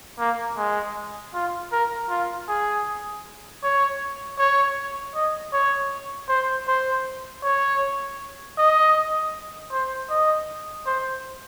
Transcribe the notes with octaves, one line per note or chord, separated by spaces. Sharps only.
A#3
G#3
F4
A#4
F4
G#4
C#5
C#5
D#5
C#5
C5
C5
C#5
D#5
C5
D#5
C5